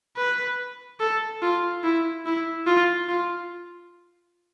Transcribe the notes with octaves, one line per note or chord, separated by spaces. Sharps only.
B4
A4
F4
E4
E4
F4
F4